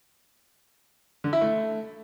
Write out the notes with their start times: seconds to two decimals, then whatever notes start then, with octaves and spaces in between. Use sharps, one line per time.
1.24 D3
1.33 E4
1.41 A3